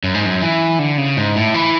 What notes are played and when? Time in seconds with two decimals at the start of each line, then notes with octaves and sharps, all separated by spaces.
0.04 F#2
0.14 G#2
0.26 F#2
0.42 E3
0.79 D3
0.98 C#3
1.17 G#2
1.36 A2
1.54 E3